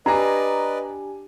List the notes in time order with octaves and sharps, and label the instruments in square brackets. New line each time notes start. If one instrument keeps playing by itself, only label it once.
[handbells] D4 G4 G#5 [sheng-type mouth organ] B4 D5 D#5 [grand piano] A#5